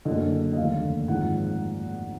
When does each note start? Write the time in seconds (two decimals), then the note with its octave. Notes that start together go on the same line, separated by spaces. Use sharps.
0.05 F#1 F#2 D3 D#5
0.53 D#5
0.57 F1 D#2 D3 F5
1.08 G#1 G#2 F3 F#5